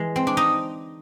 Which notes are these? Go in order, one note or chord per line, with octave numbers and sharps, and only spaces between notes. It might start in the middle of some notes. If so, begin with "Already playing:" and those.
Already playing: E3 G#3
C4
D4
D#4